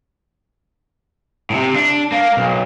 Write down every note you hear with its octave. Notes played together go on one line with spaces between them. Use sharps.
A2 C3
D4
A#3
B1